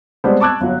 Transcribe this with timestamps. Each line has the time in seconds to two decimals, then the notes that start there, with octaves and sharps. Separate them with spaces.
0.24 G3 G#3 B3 C4 D4 C5
0.40 A5 C#6 D6 E6 F#6 G#6
0.61 G1 F#3